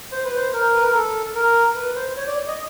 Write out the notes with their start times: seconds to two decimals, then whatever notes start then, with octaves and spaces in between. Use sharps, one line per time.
0.12 C5
0.24 B4
0.36 C5
0.53 A#4
0.75 B4
0.84 A#4
0.94 A4
1.35 A#4
1.76 B4
1.96 C5
2.17 C#5
2.27 D5
2.47 D#5